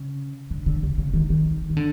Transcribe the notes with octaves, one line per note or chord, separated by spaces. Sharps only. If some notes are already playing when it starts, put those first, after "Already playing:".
Already playing: C#3
D3
D3
C#3
C#3
D#3
D#3
D#3
D3